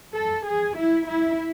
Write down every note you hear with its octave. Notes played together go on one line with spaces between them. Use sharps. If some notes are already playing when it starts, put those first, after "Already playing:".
A4
G#4
E4
E4